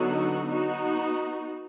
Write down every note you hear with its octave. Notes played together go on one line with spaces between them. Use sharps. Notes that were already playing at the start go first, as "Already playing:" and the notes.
Already playing: D3 F#3 B3 D#4 F#4
B3 D#4 F#4